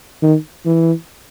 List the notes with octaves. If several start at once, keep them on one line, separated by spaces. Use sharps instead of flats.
D#3
E3